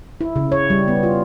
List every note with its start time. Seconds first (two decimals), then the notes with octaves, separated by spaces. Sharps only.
0.21 E4
0.36 C#3
0.52 C#5
0.70 G3
0.88 B3
1.03 F4